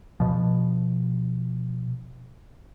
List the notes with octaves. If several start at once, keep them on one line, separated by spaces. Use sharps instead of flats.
B2 F3